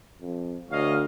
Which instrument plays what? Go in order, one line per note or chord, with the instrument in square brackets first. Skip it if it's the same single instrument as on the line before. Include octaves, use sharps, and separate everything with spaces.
[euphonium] F2
[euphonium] D2 [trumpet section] C#5 D#5 F5